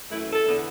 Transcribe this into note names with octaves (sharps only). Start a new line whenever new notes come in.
F#2 E3 A3 E4
A4
E2 D3 B3